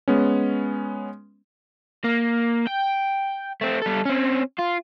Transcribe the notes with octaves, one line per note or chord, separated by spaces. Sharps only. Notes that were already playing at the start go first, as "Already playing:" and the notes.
G#3 B3 C#4
A#3
G5
A3 C4
G3 A4
C4 C#4
F4